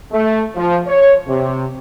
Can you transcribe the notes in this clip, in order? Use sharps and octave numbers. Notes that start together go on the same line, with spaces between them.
A3
F3
C#5
C3